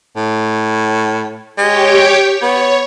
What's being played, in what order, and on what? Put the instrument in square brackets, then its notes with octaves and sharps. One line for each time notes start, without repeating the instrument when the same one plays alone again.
[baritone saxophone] A2
[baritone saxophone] G#3 [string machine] G4 C#5 G5
[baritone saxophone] B3 [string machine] C#5